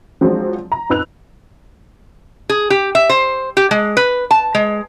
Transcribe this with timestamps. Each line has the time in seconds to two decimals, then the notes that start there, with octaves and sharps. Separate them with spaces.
0.21 F3 F#3 G#3 C4 D4 F#4
0.72 A#5
0.90 F2 D#4 B4 E6 F#6 F7
2.49 G#4
2.70 G4
2.95 E5
3.09 C5
3.57 G4
3.71 G#3
3.97 B4
4.31 A5
4.55 G#3